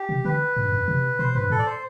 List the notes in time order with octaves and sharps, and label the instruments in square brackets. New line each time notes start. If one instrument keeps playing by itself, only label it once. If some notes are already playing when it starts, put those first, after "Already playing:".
Already playing: [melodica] G4
[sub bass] C3
[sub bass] D3 [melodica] B4
[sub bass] G2
F#2
C3
[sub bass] B2 [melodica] C5
[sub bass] G2 [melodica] B4
[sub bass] A2 [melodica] A4
[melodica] D5
C5